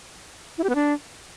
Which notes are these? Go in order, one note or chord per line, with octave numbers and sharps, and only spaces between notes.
E4
G4
B3
D4